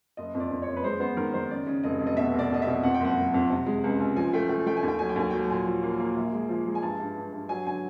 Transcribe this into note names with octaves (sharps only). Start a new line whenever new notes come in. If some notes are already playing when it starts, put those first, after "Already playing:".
F#1 D#5
F2
D5
F2
F#1 C#5
B4
G#3 C5
B3 C5
D#3 A#4
D#3 C5
C#3 D5
C#3
F1 D#5
F1
D#5
B2 E5
C2 D5
B2 D#5
B2 E5
F2 F#5
G5
F#1 F#5
F#1
F2
C3
G#3
C#2
C#2
F3 G#5
A3 G5
A3 G5
A3 G5
G#5
D#2
G5
F#3 G#5
G5
D#2 G#5
F#3 G5
A#2 G#5
F3
A#3
A#3
A#1
G#3
F3
G#3
G#5
G2 A5
G2
G2
G2
F#3 G#5
D3 G#5